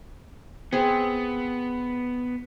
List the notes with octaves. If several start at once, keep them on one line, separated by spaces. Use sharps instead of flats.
B3 C4 G#4